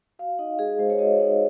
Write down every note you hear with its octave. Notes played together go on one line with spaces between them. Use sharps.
F#4 F5
D#4 D#5
G#3 G#4
G#3 C5
C#5
F#4 D#5
D#4